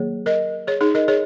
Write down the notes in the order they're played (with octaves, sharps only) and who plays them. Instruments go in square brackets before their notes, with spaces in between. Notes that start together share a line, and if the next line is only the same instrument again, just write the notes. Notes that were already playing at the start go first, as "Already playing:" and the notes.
Already playing: [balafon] D#3 F#3 A#3 G#4 C#5
A#4 D#5
G#4 C#5
D#4 G#4
A#4 D#5
G#4 C#5